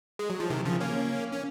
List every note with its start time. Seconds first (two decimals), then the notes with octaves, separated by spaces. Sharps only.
0.19 G#3
0.30 F#3
0.40 F3
0.50 C3 D#3
0.65 C#3 F3
0.80 A#3 C#4
1.33 C#4